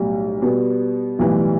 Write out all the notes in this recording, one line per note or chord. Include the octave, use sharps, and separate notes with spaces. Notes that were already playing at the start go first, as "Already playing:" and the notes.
Already playing: B1 A2 G3
B2 G3 B3
B1 A2 E3 G3